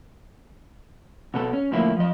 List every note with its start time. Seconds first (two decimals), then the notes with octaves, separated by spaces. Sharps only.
1.34 B2 B3 A4
1.53 C#4
1.72 A2 D3 F3 A#3 E4
1.97 F3 D#5